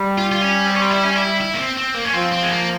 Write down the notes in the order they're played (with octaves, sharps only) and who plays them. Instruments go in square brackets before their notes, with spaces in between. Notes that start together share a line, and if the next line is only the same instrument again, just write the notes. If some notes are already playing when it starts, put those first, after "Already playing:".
Already playing: [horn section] G3
[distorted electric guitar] F4
F4
C#4
C4
C#4
C4
E4
C#4
E4
E4
A#3
C4
C4
A#3
C#4
[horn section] F3 [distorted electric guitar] C4
[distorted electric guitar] C4
G#3
A#3